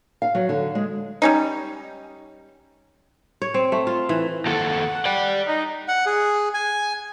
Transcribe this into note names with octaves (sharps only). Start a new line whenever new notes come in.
F5
F#3
D3
G#3
G3 C#4 D#4
C#5
C4
A3
F4
E3
D#2 A4 F#5
D5 G5
D#4
F#5
G#4
G#5